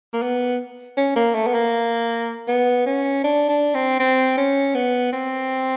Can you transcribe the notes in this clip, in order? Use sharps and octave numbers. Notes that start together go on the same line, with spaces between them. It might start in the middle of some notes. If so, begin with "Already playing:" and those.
A#3
B3
C#4
A#3
A3
B3
A#3
B3
C#4
D4
D4
C4
C4
C#4
B3
C4